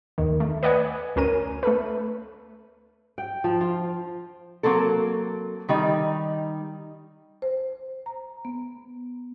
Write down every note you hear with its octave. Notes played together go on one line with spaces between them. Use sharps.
D#2 D#3
A3
B4 D5 D#5 F#5 G#5
D2 C#4 A#4 D#7
A3 A4 B4
G5
F3
F4
F#3 A#3 C4 A4
D#3 G3 D#4
C5
A#5
B3